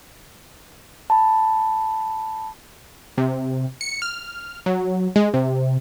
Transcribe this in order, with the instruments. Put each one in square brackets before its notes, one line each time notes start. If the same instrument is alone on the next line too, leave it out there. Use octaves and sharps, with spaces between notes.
[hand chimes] A5 B5
[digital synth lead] C3
C#7
F6
F#3
G#3
C3